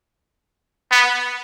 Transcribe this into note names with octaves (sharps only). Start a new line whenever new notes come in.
B3